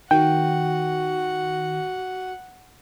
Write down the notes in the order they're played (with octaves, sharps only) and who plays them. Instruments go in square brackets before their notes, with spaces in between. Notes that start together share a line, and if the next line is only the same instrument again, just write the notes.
[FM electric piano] D#3 [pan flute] F#4 [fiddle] F#5 [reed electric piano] G5